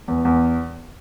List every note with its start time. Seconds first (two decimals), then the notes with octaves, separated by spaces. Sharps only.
0.08 E2
0.25 E2